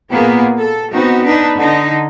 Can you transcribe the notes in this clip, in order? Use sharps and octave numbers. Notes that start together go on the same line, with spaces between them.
A#2 A#3 B3 G#4
A4
B3 C4 D#4 F#4
D4 D#4 B4
D3 D#4